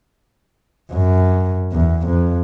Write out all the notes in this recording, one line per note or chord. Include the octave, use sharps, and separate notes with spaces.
F#2
E2
F2